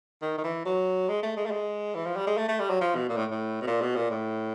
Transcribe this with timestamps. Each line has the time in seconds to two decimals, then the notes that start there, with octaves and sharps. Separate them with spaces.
0.22 D#3
0.38 D#3
0.44 E3
0.65 F#3
1.09 G#3
1.23 A3
1.37 G#3
1.46 A3
1.51 G#3
1.95 E3
2.05 F3
2.16 G3
2.27 G#3
2.37 A3
2.48 A3
2.60 G3
2.70 F#3
2.81 F3
2.95 B2
3.09 A#2
3.17 A2
3.31 A2
3.61 B2
3.67 A#2
3.81 B2
3.96 A#2
4.10 A2